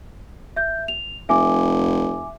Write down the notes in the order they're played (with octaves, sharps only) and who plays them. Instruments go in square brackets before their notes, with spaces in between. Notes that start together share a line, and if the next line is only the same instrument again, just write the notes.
[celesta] E5 G6
F7
[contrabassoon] F1 [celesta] E5 G#5 D6